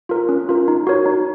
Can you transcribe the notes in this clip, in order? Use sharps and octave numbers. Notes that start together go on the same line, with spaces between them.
F4 A#4
C#4
F4 A#4
D#4
F#4 A#4 C#5
D#4